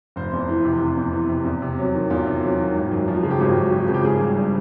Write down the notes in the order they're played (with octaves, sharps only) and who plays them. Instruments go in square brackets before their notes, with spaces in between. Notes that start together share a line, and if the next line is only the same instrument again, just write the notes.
[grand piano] F1 C5
E2
E3
C3
F1
E2
E3
C3
E2
C3
F#3
D#3
E2 F4
C3
F#3
D#3
G#1
F#2
F3
C#3
G4
G#1 F#4
F#2
F3
C#3
G4
G#1 G#4
G2
G3